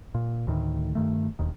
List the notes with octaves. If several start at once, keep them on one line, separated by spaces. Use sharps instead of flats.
A#2
D2 A2 D#3
G2 D#3 A3
E1 D#2 D#3